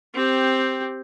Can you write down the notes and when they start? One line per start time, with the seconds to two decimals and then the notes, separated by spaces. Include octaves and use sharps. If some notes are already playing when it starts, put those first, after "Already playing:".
0.14 C4 G4